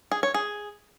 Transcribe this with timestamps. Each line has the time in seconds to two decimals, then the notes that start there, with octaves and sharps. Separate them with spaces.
0.11 G#4
0.23 C#5
0.34 G#4